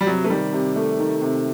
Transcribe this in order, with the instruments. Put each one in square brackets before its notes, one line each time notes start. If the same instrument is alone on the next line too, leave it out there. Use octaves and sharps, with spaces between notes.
[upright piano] G3
[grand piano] C3 [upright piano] F#3
[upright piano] A3
[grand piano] D#3 [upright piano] G3
[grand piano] C3
A3
D#3
C3